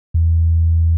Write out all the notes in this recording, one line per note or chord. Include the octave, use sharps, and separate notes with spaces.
E2